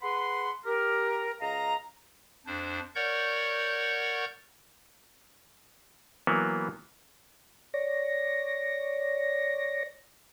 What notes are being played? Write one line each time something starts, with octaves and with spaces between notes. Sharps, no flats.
G#4 B4 F#5 B5 C6
G4 A#4
C#2 D#5 F5 A#5
F2 D4 C5
A#4 C#5 D5 F#5 C#6 G6
E3 F#3 A#3 B3
C#5 D5 A#6